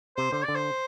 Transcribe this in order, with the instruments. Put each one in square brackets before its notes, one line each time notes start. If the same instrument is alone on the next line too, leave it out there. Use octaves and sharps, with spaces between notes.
[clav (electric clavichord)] C3 [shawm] C5
[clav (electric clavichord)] D3 [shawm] C5
[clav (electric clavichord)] D3 [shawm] D5
[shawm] C5